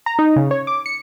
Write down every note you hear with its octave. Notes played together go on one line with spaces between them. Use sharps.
A#5
D#4
C#3
C#5
D6
C#7